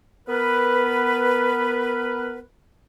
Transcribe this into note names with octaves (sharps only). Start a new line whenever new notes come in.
B3 A#4 B4